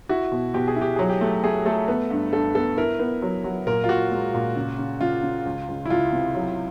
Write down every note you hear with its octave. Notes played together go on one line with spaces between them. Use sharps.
E4 F#4
B2
B2 G4
G#4
E4
G4
F#3 G#4
G4
A3
A3 G#4
A3 A4
B3
G2
G2 A4
B3 A4
E4 A#4
B3
F#3
F#3
A#2 A#4
F4
A#2 F#4
G#3
A#2
C#3
C#3
C#3 F4
C#3
C#2
C#2
E4
C#2 F4
C3
F#3